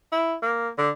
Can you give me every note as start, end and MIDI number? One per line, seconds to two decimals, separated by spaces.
0.12 0.34 64
0.42 0.69 58
0.78 0.90 50